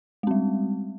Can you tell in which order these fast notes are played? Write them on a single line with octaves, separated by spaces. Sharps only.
G#3 C4 G3